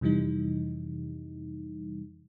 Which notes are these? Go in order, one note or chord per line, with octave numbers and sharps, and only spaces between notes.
F2 C3 E3 G3 D#4